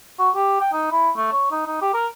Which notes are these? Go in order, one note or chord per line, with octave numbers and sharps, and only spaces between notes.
F#4
G4
G5
D#4
E4
A3
C#5
D#4
D#4
G4
A#4